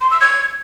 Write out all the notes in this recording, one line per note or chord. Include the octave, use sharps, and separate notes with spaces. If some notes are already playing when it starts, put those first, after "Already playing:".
C6
E6
G#6